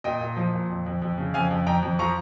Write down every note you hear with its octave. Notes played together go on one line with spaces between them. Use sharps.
A#2 D#5 G5
A#2
F3
A#2
F2
F2
F2
C#3
F2 F5 G#5
F2
F2 G5 A#5
F2
F3 A#5 C#6